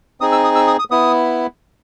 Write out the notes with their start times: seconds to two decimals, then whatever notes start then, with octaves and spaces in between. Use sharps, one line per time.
0.21 C4 D#4 G#4 D#6
0.32 E6
0.44 D#6
0.55 E6
0.67 D#6
0.79 D#6
0.91 B3 E4 D#6